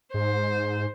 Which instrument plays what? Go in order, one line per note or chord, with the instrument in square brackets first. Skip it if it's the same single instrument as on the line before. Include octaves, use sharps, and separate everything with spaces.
[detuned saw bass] G#2 [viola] C5